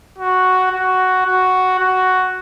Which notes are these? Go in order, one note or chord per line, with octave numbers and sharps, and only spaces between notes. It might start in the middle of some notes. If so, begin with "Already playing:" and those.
F#4
F#4
F#4
F#4